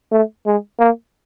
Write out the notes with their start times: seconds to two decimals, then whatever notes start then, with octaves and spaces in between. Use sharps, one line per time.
0.12 A3
0.46 G#3
0.79 A#3